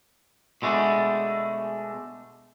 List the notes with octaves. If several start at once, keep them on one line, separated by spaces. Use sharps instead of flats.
B2 G#3 A3 D4